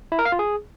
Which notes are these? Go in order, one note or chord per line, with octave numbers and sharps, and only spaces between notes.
E4
A#4
F5
F4
G#4